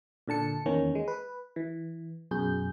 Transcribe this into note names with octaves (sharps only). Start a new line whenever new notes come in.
A#2 D3 A5 C#7
E2 D#3 A#3 C#4
G#3
B4
E3
F#2 B2 G#4 G6